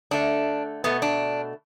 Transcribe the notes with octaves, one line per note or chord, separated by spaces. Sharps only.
D3 A3 D4
B2 A3 B3
D4